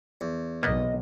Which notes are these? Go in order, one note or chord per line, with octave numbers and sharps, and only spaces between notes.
E2
B1 A#3 B3 D#5